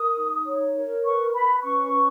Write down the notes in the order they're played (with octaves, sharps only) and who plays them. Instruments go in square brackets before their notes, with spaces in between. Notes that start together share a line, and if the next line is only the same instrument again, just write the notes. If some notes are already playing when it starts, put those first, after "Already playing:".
Already playing: [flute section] A#4 D#6
D#4
C#5
A#4
B4 C#6
B4 B5
C#4 C#6
B4